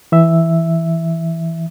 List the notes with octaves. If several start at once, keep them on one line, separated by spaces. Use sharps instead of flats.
E3 E5